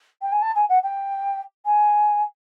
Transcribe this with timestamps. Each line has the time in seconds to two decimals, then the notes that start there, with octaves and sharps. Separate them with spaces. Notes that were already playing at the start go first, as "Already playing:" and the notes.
0.22 G5
0.32 G#5
0.42 A5
0.55 G#5
0.69 F#5
0.83 G5
1.65 G#5